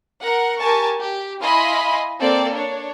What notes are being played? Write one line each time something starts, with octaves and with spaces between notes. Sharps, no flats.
A#4 F#5
G4 A#4 G#5 A5 C#6
G4
E4 D#5 F5 G#5 B5 C6
A#3 C4 A4 D5 F5
D4 C#5